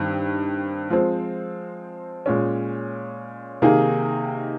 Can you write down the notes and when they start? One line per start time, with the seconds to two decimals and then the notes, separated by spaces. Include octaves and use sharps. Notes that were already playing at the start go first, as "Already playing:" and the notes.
Already playing: G2 D#3 C4
0.90 F3 G#3 C4
2.26 A#2 G#3 C#4
3.62 C3 D#3 A#3 D#4 G#4